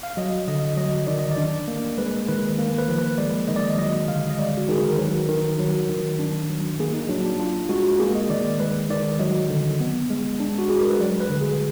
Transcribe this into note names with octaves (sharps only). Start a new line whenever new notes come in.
F5
F#3 D#5
D3 D#5
F#3 D#5
D#3 D5
D#5
D5
D4
A#3
G#3 B4
D#3 B4
A#3
B4
F3
B4
G#3 D5
D#3 D#5
D5
D#5
F#3 D#5
D3 F5
D#5
G#3 D5
F#4
D#3 G#4
A#4
F#3 B4
D#3 A#4
F#3
D#3
D4
F#3
A#3 G#4
D#4
F#3 D4
D4
D4 F4
G#3 F#4
F#4
A#3 G#4
D#5
D#3 D5
D5
G#3 B4
D#3 D5
F#3 D#5
D3
B3
G#3
D4
F#4
G#3 G#4
A#4
B4
F#3 D5
B4
D3
G#4